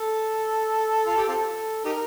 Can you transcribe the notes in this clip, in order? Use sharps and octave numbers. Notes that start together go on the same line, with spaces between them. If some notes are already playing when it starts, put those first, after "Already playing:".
Already playing: A4
F4
G4
C4 F4 A4
D#4 G4 A#4